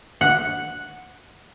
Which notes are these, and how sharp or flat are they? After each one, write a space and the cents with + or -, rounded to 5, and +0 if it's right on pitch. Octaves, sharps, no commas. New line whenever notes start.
F#5 -5